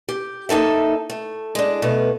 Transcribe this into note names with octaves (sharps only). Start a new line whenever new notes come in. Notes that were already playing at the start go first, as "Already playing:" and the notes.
G4
A#3 D#4 A4 E5
A3
G#3 D4
B2 A3 B3